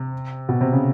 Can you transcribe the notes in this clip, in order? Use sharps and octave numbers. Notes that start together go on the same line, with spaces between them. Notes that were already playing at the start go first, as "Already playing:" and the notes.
Already playing: C3
B2
C3
C#3